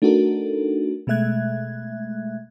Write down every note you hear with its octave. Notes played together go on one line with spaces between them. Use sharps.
A3 D4 D#4 F#4 A4 A#4
B2 G#3 A3 E5 F#6 G#6